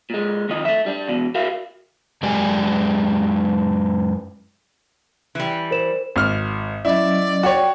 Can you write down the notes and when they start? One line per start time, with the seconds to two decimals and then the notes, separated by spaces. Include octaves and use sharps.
0.10 A#2 G#3
0.49 F2 D#3 F3 D#5
0.65 A3 E5
0.86 G3 D4
1.08 E2 B2
1.35 F#4 A#4 E5 F5
2.23 F#2 G#3 G4 D5 G#5
5.35 E3 G3
5.71 A#4 C5 E7
6.16 G#1 F6
6.85 F#3 C#4 E4 D5 D#5
7.43 F#4 C#5 G5